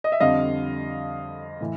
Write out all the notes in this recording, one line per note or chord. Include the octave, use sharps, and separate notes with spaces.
D#5
E5
F2 D3 G3 D#5 F5
A2 E3